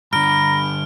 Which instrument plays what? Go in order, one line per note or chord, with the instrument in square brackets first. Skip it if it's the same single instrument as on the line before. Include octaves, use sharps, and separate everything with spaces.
[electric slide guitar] G2 D3 [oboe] A#5 [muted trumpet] B5 [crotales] F6 D7